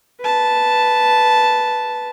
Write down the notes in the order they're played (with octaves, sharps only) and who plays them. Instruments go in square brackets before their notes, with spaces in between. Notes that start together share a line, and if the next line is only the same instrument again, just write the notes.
[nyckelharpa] B4 A5